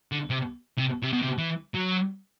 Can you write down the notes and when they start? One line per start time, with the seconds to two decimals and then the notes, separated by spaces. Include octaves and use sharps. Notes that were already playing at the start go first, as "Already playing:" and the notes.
0.12 D3
0.30 C3
0.78 C3
1.03 C3
1.13 B2
1.23 C3
1.38 E3
1.75 F#3